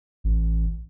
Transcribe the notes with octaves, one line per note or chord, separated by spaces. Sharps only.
A1